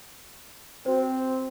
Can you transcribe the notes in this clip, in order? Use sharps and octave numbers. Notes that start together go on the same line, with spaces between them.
C4 F#4 C5